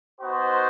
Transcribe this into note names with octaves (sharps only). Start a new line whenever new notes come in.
B3 D#4 F#4 C5